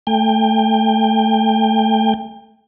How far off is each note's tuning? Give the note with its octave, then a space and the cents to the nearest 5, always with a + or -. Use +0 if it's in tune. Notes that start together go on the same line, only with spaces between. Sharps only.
A3 +0 G5 +30